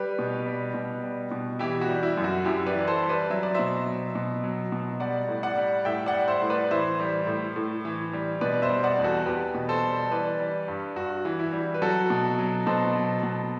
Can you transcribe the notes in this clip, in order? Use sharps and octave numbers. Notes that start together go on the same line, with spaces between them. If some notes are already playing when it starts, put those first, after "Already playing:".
Already playing: G3 G4 B4
B2
G3
B2
G3
B2
E3 E4 G4
F#4
G3
E4
F#2
F#4
F#2 E4 G4
B4 D5
E3
A4 C5
G3
B4 D5
F#3 E5
D5
B2 C5 E5
F#3
B2
F#3
B2
G3 D5 F#5
A2
D5 F#5
G3
A2 E5 G5
D5 F#5
G3
C5 E5
A2
B4 D5
E3 C5 E5
G3
A2
A2
E3
G3
B2 B4 D5
C5 E5
G3
D5 F#5
E2
F#4 A4
E2 G4 B4
B2
A4 C5
G3
E3 B4 D5
G3
G2
G2 F#4
E3
E4
G3
B4
F#3 F#4 A4
B2
F#3
B2 A4 C5
F#3
B2